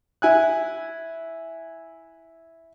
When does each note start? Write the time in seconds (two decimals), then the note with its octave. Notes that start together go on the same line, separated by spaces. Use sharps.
0.22 E4 G#5 F#6